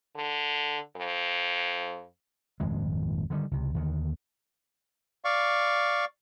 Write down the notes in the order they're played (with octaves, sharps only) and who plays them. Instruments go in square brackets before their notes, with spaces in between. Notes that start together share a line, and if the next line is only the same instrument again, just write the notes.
[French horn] D3
F2
[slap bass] D#1 G#1 F2 G#3
D3 D#3 F3 G3
C#2 C3
D#2 D3 D#3
[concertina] D5 F5 C#6